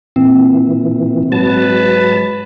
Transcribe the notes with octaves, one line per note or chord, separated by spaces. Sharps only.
A#2 E3 C4
G#2 F#3 B4 A5